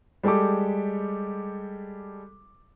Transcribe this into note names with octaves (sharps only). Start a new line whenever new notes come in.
G3 G#3 G4 A4 D6